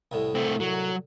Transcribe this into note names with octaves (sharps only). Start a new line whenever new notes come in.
C2 A2
A3 C4
F#3